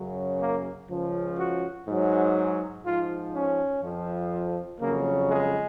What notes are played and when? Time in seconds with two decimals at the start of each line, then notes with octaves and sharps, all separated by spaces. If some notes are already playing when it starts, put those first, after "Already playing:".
Already playing: F#2 C#3 F#3
0.40 A#3
0.89 C#2 C#3 F3
1.38 F#4
1.87 G#2 F#3
2.84 G#2 F3 F4
3.34 C#4
3.82 F2 F3
4.80 F2 C#3 F#3 A#3
5.29 G#3